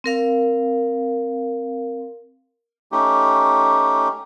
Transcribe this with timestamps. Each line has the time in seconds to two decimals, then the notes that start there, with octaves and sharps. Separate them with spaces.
0.04 C4 A#4 F5
2.92 A3 C#4 D#4 G4